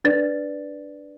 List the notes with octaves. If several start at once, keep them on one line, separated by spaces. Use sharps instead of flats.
D4 B4 D5 A6